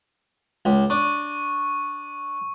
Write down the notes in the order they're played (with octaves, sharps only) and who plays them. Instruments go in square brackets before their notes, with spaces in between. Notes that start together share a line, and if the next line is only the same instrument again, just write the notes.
[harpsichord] C#2
[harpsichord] D4 [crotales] C#6